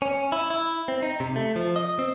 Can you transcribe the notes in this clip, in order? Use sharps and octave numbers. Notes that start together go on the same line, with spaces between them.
C#4
E4
E4
C4
D#4
C3
A3
F3
D#5
C4